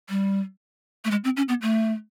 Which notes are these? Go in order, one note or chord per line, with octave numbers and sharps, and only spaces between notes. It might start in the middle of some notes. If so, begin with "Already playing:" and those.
G3
A3
G#3
C4
C#4
B3
A3